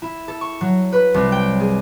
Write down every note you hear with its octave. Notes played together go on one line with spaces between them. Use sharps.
E4
A4
C#6
F#3
B4
C2
G5
G#4